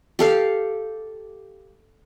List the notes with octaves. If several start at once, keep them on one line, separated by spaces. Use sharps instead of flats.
G4 A4 F5